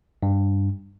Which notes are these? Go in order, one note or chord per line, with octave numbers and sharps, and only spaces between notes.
G2